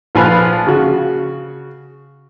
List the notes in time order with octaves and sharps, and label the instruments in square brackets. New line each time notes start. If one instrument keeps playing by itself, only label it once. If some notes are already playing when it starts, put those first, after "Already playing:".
[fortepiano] A#1 F3 F5 G#5 B5 F#6
C#3 F#4